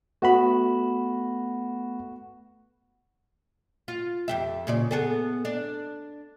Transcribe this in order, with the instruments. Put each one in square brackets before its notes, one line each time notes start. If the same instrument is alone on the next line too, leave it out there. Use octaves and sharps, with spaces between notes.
[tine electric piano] A3 B3 B5 [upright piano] F#4
[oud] F4
F2 G4 E5
A#2 C#3 D5
B3 G#4 A4
D4